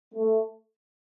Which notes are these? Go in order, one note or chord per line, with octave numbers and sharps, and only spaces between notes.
A3